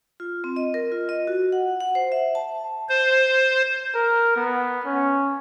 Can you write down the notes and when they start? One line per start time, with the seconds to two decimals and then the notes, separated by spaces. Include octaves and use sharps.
0.20 F4
0.44 C4
0.56 D#5
0.74 A#4
0.92 F4
1.09 D#5
1.27 F#4
1.52 F#5
1.80 F#5
1.95 C5
2.12 E5
2.35 A5
2.89 C5
3.95 A#4
4.36 B3
4.86 C#4